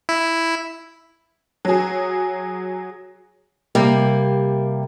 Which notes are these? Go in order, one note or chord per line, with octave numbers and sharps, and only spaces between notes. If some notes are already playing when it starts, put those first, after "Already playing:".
E4
F#3 G#4
C3 G3 A#3